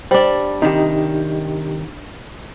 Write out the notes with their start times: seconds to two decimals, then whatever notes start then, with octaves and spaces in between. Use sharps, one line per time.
0.11 G3 D4 C5
0.62 C3 D#3 D#4 G4